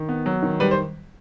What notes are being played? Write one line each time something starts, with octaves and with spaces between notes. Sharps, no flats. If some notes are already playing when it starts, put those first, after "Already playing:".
Already playing: D#3
B3
F#3
D#3
G3 B4
C5